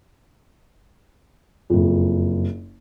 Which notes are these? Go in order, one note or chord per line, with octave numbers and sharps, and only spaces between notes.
F#1 F2